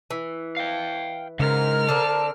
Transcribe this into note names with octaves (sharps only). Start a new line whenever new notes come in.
E3
F5 G5
G#2 C#3 A#4 F6
D3 C4 D4 A5